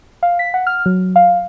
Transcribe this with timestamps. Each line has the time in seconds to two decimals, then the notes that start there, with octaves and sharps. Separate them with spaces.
0.23 F5
0.39 B6
0.54 F#5
0.67 F6
0.86 F#3
1.16 F5